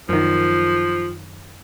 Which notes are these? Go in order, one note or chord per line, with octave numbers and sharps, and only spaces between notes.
F#2 D#3 F3